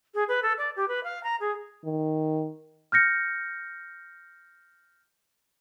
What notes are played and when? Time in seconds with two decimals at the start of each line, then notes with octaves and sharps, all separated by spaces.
0.14 G#4
0.28 B4
0.42 A4
0.58 D5
0.76 G4
0.88 B4
1.04 F5
1.23 A#5
1.40 G#4
1.84 D#3
2.92 F6 G6 A#6 C#7